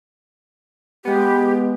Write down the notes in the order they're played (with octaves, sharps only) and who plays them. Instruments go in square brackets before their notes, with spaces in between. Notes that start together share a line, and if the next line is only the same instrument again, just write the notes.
[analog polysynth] G#3 B3 [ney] G4